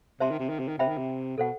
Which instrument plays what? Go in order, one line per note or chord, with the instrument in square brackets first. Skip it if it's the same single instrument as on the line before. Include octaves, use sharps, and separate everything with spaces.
[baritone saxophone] C3 [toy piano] C5 E5 A5 C6
[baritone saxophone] D#3
C3
D#3
C3
D#3
[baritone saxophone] C3 [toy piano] C5 E5 G5 B5
[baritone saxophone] D#3
C3
[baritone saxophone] B2 [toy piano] A4 C5 F#5